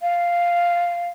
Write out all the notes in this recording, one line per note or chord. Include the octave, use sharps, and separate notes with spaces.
F5